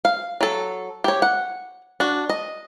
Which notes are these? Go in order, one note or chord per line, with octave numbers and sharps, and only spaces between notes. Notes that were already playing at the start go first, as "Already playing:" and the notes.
F5
F#3 A4
G4 C#5
F#5
D4 F#4
D#5